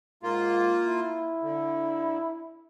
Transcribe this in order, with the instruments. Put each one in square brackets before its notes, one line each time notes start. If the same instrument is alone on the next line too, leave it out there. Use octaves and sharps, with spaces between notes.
[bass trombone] G#2 [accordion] A#3 F4
[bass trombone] E4
[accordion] D3